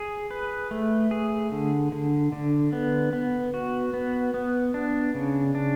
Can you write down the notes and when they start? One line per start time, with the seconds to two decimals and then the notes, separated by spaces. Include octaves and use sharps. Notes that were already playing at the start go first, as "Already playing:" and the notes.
Already playing: G#4
0.31 B4
0.71 A3
1.11 G#4
1.52 D3
1.92 D3
2.32 D3
2.73 B3
3.13 B3
3.54 F#4
3.94 B3
4.34 B3
4.74 D4
5.15 C#3
5.55 D4